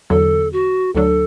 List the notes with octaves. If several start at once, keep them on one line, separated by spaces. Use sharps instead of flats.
E2 D3 F#3 A4
F#4
D2 D3 F#3 D4 A4